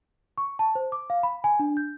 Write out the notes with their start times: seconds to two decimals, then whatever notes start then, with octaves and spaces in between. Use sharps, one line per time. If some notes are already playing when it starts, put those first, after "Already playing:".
0.38 C#6
0.59 A5
0.75 C5
0.92 D6
1.10 F5
1.23 B5
1.44 G#5
1.60 D4
1.77 G6